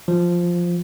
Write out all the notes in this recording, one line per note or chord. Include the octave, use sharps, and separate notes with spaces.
F3